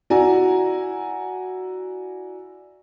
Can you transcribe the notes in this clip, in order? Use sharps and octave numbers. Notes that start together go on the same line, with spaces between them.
E4 F#4 D5 G#5 A#5